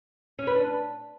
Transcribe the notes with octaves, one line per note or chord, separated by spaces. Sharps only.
C#4
B4
D4